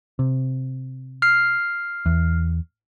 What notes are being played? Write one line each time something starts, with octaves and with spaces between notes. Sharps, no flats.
C3
F6 C7
E2